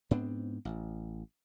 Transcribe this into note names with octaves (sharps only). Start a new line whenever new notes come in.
G#2 B3 C4 D4
A1